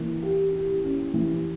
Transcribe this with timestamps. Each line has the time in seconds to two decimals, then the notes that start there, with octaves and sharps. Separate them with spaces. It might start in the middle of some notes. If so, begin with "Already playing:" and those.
Already playing: E3 A#3
0.22 G4
0.53 G4
0.83 C#4
1.14 E3